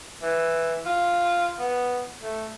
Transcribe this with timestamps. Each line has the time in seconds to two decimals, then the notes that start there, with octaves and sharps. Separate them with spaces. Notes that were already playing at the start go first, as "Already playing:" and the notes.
0.22 E3
0.86 F4
1.59 B3
2.22 A3